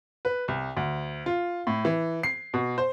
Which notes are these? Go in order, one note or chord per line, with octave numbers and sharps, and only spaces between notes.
B4
C2
D2
F4
A2
E3
C7
B2
C5